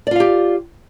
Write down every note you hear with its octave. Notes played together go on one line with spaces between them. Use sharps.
F4 G4 D5 F5